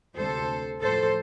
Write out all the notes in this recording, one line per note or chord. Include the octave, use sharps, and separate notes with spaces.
D2 C3 G3 A4 C5
A2 F3 A3 A4 C5